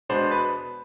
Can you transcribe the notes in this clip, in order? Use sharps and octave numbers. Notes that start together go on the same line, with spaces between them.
B2 G#3 B3 D4 C5
B4